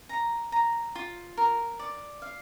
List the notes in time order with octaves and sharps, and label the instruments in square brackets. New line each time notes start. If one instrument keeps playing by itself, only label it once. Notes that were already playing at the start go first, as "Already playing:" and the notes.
[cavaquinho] A#5
A#5
F4
A#4
D5
F5